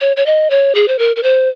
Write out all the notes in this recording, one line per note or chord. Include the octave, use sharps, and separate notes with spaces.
C#5
C#5
D#5
C#5
G#4
C5
A#4
A#4
C5